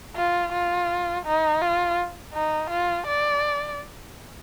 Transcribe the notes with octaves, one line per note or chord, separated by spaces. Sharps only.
F4
F4
D#4
F4
D#4
F4
D5